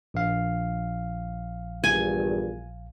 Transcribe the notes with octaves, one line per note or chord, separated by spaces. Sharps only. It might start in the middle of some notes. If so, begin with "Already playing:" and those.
A#1 F5
E2 G2 A#2 G#5